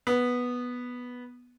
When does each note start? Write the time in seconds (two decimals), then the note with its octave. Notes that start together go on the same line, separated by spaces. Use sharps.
0.07 B3